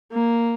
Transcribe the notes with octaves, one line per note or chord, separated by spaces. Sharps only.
A#3